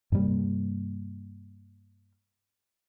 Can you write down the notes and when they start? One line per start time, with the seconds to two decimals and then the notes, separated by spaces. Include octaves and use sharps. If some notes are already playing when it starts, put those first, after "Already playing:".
0.12 G2 C3 G3 A#3